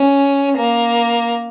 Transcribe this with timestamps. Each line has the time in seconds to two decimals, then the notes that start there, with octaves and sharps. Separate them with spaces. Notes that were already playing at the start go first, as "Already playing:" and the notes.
Already playing: C#4
0.57 A#3